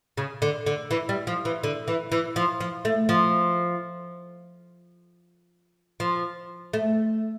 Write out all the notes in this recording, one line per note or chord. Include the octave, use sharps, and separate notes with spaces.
C#3
D3
D3
E3
G3
F3
E3
D3
E3
E3
F3
F3
A3
F3
F3
A3